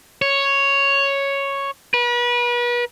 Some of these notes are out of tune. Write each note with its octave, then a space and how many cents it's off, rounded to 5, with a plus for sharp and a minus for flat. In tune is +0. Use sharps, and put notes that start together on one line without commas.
C#5 +0
B4 -35